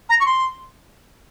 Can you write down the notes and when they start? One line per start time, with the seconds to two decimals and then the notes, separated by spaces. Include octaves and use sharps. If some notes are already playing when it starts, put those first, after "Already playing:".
0.09 A#5
0.19 C#6
0.25 C6